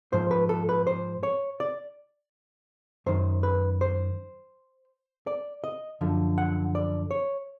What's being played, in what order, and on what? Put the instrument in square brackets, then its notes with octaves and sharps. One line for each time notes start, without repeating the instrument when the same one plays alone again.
[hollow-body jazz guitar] G#2 F3 C5
B4
A4
B4
C5
C#5
D5
F#2 D#3 C5
B4
C5
D5
D#5
F#2 D3 F3
F#5
D5
C#5